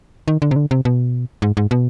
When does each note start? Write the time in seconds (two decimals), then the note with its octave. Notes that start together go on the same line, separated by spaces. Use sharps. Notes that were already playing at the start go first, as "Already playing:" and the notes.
0.28 D#3
0.42 D3
0.51 C3
0.56 D3
0.71 C3
0.85 B2
1.42 G#2
1.57 G#2
1.71 B2